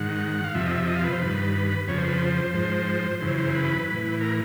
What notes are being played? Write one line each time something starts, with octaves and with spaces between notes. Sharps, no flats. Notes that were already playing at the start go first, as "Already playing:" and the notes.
Already playing: G#2 D#3 F#5
F5
F2 C3 F3 E5
D#5
E5
D#5
F5
B4
C5
G2 D#3 B4
F2 C#3 F3 C#5
C5
B4
C5
G#2 F3 C5
F#2 C#3 E3 C5
C5
B4
A2 E3
A#4